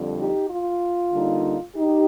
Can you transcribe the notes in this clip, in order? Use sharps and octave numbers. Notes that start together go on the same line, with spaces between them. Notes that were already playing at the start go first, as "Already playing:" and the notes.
Already playing: F2 D3 G3
D#4 G4
F4
D3 G3 A#3 D#4
D#4 G4